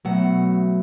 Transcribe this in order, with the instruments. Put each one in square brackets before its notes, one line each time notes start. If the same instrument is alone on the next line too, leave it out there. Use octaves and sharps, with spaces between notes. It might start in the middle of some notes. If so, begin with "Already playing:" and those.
[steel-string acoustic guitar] B2 F#3 A3 F#5